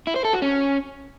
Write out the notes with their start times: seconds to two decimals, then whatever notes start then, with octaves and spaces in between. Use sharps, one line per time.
0.07 E4
0.16 C5
0.25 A4
0.33 F#4
0.42 C#4